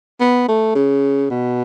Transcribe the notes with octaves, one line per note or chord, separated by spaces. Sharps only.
B3
A3
C#3
B2